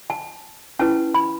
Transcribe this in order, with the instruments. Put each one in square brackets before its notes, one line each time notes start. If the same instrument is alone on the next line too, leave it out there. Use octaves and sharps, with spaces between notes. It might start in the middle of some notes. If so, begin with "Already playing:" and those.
[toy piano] A5
C#4 E4 B4 A5
B5